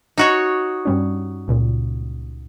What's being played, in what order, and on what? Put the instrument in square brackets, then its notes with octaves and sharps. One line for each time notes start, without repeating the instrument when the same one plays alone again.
[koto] D#4 F#4 C#5
[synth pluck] G2 G3 C#4
C#2 A#2